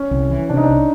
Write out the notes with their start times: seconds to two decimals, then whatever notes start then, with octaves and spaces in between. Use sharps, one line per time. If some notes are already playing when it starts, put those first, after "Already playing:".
Already playing: C#4
0.11 C2
0.30 E3
0.49 C3 D4
0.57 D#4
0.64 C2 D4